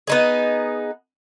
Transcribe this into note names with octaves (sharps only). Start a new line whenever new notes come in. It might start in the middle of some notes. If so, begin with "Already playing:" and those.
B3 D#4 G#4